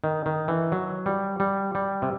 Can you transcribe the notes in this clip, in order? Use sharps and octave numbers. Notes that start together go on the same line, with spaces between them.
D#3
D#3
E3
F#3
G3
G3
G3
C3